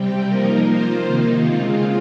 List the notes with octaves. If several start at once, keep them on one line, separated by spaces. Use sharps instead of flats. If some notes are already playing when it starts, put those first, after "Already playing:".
Already playing: C3 G3 C4 G4
F3 A#3 D#4 A#4
A#3 F4 C5
C3 D#3 A#3 D#4
C#3 G#3 C4 F4